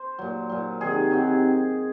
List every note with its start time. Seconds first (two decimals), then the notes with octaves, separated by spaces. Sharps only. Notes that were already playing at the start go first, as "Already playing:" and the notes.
Already playing: C5
0.19 A#2 F#3
0.50 A#2 F#3
0.81 C3 D#3 F#3 G#4
1.11 C3 D#3 F#3